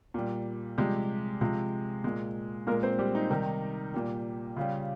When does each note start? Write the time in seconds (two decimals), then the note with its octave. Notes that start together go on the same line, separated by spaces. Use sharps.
0.14 A#2 G3
0.78 C3 F3 G3 G#3 G4
1.41 C3 F3 G#3
2.04 A#2 G#3
2.67 A#2 G#3 A#3 A#4
2.83 C4 C5
2.99 G3 G4
3.15 D#4
3.30 C3 D#3 G3
3.94 A#2 G3
4.56 C#3 G3 F4